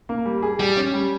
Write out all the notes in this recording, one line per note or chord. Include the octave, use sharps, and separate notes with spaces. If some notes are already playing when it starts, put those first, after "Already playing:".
A#3
G3
G#4
G3 G4
C#4
G3